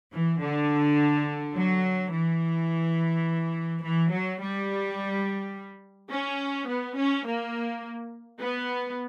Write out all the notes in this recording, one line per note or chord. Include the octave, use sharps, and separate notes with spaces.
E3
D3
F#3
E3
E3
F#3
G3
C#4
B3
C#4
A#3
B3